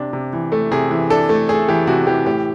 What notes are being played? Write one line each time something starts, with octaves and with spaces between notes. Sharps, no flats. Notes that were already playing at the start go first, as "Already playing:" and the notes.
Already playing: C3 D4
C3
E3
A3
C3 G#4
E3
D4 A4
A3
A3 G#4
E3 G4
C3 F#4
E3 G4
A2 G4